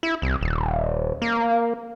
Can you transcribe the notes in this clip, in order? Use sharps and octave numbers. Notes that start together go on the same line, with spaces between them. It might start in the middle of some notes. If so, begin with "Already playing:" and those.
E4
C2
D#1
A#3